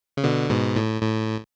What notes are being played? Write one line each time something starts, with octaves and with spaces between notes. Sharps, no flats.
C#3
B2 D3
G#2 B2
A2
A2